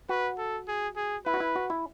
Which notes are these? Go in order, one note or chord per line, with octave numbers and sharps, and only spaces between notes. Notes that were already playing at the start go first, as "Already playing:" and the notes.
F#4 B4
A4
G#4
G#4
E4 B4
F#4
E4
F#4
E4